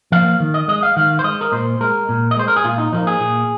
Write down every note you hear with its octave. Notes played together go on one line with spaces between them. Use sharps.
F3 A#3 F5
D#3
D#5
G#3 D#5
F5
D#3 F5
C5
G#3 D#5
A#4
A#2 C5
G#3 A#4
A#2
D#5
G#3 C5
A#4
G#4
A#2 F4
D#4
F3 A#3 D#4
G#4
A#2